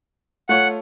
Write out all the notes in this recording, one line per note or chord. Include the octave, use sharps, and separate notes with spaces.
A3 F4 C#5 F#5